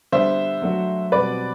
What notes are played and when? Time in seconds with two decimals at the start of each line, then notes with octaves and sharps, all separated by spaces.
0.12 D3 G3 B3 D4 C5 E5
0.62 F#3 A3 D4 F#4
1.12 B2 G3 C4 F#4 B4 D5